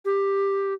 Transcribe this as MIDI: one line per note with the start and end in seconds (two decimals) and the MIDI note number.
0.05 0.74 67